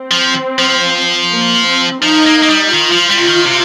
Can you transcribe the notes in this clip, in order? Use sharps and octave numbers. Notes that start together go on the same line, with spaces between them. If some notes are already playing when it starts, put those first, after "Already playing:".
Already playing: C4
F3
F3
A#3
C4
F3 D#4
A#3
A#3
G3
D#3 F4
F3
G3
C3
D#3
C3